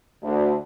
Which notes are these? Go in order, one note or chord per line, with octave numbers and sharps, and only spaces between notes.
D2